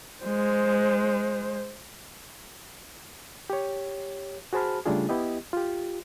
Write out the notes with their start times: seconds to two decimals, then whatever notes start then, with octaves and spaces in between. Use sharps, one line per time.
0.22 G#3 C5
3.50 G4 C#5
4.53 F#4 G#4 C5 A5 B5 F6
4.85 C#3 G3 A3 D4 F4 G#4
5.09 B3 E4 G4 D#5
5.53 F4 G4